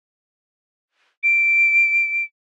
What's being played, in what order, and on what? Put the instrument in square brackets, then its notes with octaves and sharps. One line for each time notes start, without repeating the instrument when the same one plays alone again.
[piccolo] D7